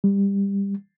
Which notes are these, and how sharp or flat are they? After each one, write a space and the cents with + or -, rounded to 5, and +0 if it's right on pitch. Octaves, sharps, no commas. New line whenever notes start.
G3 +20